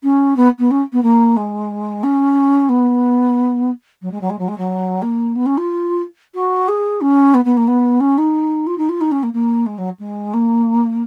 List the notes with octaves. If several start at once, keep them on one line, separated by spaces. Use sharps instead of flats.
C#4
B3
B3
C#4
B3
A#3
G#3
C#4
B3
F#3
G#3
F#3
G#3
F#3
G#3
F#3
A#3
B3
C#4
F4
F#4
G#4
C#4
B3
B3
A#3
B3
C#4
D#4
F4
D#4
F4
D#4
C#4
A#3
A#3
G#3
F#3
G#3
A#3